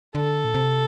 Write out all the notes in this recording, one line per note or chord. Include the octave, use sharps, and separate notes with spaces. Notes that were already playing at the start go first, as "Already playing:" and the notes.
D3 A4
A#2
C3